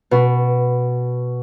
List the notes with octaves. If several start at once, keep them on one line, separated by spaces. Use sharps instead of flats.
B2